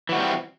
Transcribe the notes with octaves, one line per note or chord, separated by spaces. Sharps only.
E3 G3 C4 F#4